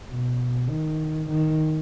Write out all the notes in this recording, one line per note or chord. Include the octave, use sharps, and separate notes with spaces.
B2
D#3
D#3